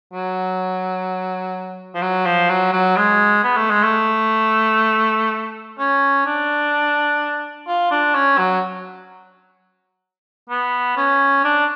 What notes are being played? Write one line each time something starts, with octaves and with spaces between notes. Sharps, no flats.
F#3
F3
F#3
F3
F#3
F#3
G#3
B3
A3
G#3
A3
C#4
D4
F4
D4
C#4
F#3
B3
C#4
D4